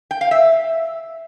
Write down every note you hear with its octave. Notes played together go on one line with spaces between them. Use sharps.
G5
F5
E5